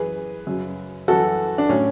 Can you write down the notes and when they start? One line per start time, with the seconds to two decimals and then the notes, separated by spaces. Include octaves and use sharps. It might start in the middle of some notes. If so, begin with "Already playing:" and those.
Already playing: F#2 E3 G#4 B4
0.47 F#2 C#3 F#3
1.08 F#2 E3 F#4 A4
1.58 D4
1.69 A2 F#3 C#4